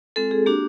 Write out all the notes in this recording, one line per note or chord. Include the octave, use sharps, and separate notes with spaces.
G#3 C4 F4 A4
G#4
A#3 D4 F#4 G4